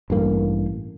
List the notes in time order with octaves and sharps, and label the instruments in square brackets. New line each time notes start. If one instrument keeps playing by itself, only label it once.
[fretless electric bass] A1 G2 A#3